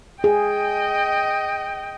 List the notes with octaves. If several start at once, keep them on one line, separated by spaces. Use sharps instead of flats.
G#4 D#5 G5